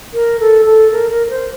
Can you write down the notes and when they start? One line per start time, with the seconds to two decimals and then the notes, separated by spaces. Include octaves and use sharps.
0.14 A#4
0.40 A4
0.66 A4
0.91 A#4
1.11 A#4
1.27 A#4
1.30 C5